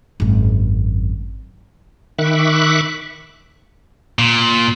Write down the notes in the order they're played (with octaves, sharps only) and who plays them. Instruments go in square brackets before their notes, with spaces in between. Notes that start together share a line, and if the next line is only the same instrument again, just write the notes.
[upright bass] G#1 F#2
[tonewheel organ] D#3 E5 B5 C#6 D6 F#6
[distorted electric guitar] A#2